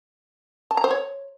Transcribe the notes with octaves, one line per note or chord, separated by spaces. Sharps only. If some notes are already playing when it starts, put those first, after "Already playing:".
A5
A#5
C5
C#5